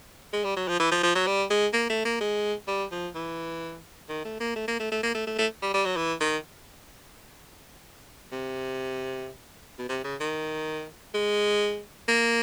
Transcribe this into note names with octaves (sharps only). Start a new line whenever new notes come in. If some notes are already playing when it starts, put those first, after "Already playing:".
G#3
G3
F#3
F3
E3
F3
F3
F#3
G3
G#3
A#3
A3
A#3
G#3
G3
F3
E3
D#3
A3
A#3
A3
A#3
A3
A3
A#3
A3
A3
A3
G3
G3
F#3
E3
D#3
C3
B2
C3
C#3
D#3
G#3
A#3